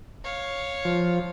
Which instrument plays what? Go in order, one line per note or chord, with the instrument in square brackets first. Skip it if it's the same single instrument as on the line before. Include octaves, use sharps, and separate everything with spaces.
[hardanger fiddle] C#5 F5
[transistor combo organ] F3